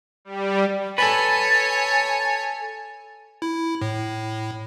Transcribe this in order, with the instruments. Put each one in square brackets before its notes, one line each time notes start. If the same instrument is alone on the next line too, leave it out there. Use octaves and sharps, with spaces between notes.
[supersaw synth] G3
[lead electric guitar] A4 B4 [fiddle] C#5 G#5 [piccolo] A6
[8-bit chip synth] E4
A2